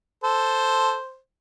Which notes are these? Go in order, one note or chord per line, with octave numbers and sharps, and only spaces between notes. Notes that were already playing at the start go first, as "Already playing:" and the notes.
A4 C5